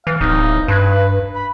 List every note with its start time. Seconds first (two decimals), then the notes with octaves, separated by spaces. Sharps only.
0.07 E3 F5
0.21 D1 D#4
0.68 G2 B4
1.35 B5